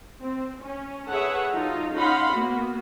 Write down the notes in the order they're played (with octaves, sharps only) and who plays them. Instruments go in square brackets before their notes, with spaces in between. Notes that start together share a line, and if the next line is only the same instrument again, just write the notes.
[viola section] C4
C#4
G#4 A4 B4 C#5 E5 F#5
F#3 D#4 F4 A4
C#4 D#4 F5 F#5 B5 C6
A#3 B3 F#4